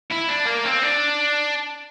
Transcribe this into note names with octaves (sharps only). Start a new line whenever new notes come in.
E4
D4
A#3
C4
D4